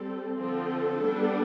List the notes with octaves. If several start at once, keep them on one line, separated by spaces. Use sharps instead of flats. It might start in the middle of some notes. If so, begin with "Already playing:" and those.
Already playing: G3 C4 A4
D3 F3 C4 A4
G3 B3 D4